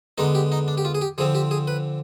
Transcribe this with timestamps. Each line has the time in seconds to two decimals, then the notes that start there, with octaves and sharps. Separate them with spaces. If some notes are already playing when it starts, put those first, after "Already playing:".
0.18 D3 G#3 B3 D#4
0.35 G4
0.52 D#4
0.68 D4
0.78 G4
0.85 F4
0.95 G#4
1.01 G4
1.18 D3 F3 C4 G#4
1.35 G4
1.51 G#4
1.68 B4